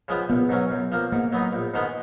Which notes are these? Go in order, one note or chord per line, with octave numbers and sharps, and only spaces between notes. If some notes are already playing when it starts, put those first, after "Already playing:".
C#3 F3 G#3 B3
A#1 B3
G#2 F#3 C#4
F#2
F3 A#3
G#2 A#3
F#3 B3 D#4
A#1
G#2 D#3 G#3 B3